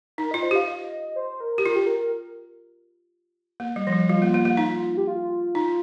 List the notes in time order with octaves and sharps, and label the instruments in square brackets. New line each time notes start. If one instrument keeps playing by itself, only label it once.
[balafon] D#4 [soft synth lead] A#4
[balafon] F4 [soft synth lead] D#5
[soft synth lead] C5
[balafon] G4 [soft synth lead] F5
[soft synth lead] D#5
C5
A#4
[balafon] G4
[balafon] F4 [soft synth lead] A#4
[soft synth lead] G4
A#4
[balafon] A#3
G3
F3
G3
[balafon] G3 [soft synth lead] F4
[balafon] A#3
A#3
A#3
D#4
[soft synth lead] G4
F4
[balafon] D#4